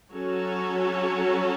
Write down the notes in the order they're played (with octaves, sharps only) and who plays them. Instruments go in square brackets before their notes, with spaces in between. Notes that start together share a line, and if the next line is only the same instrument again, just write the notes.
[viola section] F#3 C#4 F#4 A4 C#5